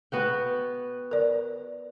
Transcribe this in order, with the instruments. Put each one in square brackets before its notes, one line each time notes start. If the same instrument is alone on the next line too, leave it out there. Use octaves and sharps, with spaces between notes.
[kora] B3 F#4 G5
[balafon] A#4 D5